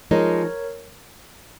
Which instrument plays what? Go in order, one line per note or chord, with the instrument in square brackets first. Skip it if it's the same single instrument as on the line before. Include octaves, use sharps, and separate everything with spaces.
[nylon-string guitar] F3 G#3 D#4 [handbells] A#4 C#5